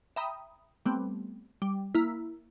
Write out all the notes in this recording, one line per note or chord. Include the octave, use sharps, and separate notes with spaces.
E5 G5 A#5 B5 D#6
G3 A3 B3 C4
G3
A#3 E4